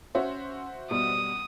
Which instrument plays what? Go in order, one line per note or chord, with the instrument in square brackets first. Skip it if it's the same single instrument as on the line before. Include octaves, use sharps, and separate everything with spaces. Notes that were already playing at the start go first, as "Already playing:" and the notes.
[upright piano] C#4 [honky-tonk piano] F#4 C5 E5
[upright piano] B2 G3 [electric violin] D#6